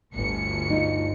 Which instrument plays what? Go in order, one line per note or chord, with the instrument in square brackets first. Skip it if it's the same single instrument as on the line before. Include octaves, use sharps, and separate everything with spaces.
[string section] G1 D2 C#7
[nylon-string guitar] D#4 F4